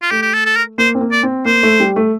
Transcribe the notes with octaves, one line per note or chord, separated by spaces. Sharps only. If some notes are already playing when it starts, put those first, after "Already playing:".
F4
A3 G4
G4
A4
A4
A#4
A#3 C5
C4
A#3
D5
C4
A#3 C5
A3
G3
A3